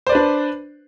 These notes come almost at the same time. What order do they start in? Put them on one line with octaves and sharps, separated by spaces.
C5 D5 B4 D4